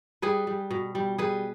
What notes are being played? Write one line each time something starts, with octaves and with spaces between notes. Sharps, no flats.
G3 G#4 B4
G3
B2
G3
G3 G#4 B4